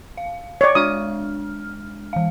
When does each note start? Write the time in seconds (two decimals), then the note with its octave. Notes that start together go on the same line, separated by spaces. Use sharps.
0.17 F5
0.61 C#5 D5
0.75 G#3 D4 D#6 F6
2.13 E3 F5